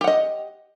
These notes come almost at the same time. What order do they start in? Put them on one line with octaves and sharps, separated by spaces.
G4 F#5 D#5